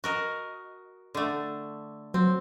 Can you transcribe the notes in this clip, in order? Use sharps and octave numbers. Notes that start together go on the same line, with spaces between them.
F#4 A#4 D#5
D3 A3
F#3 C4